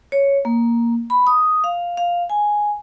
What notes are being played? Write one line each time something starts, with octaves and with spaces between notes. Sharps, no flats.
C#5
A#3
B5
D#6
F5
F5
G#5